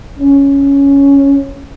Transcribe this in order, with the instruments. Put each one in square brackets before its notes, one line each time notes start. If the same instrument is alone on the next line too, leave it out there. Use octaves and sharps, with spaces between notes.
[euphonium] C#4